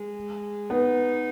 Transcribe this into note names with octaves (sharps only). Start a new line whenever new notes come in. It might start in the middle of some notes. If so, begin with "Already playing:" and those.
Already playing: G#3
B3 D#4